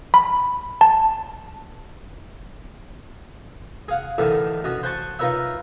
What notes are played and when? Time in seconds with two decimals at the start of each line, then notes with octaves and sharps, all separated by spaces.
0.14 B5
0.81 A5
3.88 G#4 F5 F#5
4.18 E2 A2 D3 D#3
4.64 B2 C#4 F#4
4.83 C5 F#5 G#5 A5 C#6
5.19 D#4 F4 A#4 B4 C#5 E5